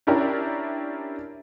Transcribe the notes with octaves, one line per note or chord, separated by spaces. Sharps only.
C#4 D4 E4 G4 A#4